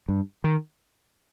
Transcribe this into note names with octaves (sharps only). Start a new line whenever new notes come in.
G2
D#3